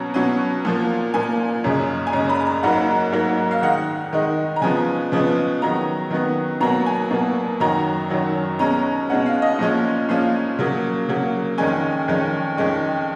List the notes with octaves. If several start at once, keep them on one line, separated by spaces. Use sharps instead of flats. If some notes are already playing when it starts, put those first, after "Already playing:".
Already playing: B2 F#3 C#4 A#5
B2 F#3 C#4
A#2 F3 A#3
A#2 F3 A#3 G#5
F#2 C#3 G#3
G#5
F#2 C#3 G#3 A#5
B5
A#5
G#2 F#3 A#3 F#5
G#2 F#3 A#3
F5
D#3 G#3 D#4 F#5
D#3 G#3 D#4
A#5
C#3 F3 G#3 B3 G#5
C#3 F3 G#3 B3
D#3 F#3 B3 A#5
D#3 F#3 B3
B2 F#3 A#3 A#5
G#5
B2 F#3 A#3
F#2 D#3 F#3 A#5
F#2 D#3 F#3
B2 G#3 C#4 A#5
B2 G#3 C#4 F#5
F5
D#5
A#2 F3 G#3 C#4
A#2 F3 G#3 C#4 F5
C#3 F#3 A#3
C#3 F#3 A#3
F2 D#3 G#3 C#4 G#5
F2 D#3 G#3 C#4
F2 D#3 G#3 C#4